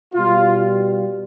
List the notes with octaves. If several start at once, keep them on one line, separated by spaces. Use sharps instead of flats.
B2 G3 F4